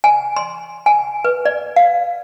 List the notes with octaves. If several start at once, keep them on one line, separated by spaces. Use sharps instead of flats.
G#5
C6
G#5
B4
D5
F5